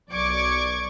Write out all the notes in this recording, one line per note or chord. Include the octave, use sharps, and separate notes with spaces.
B1 D5 C#6 D6 G#6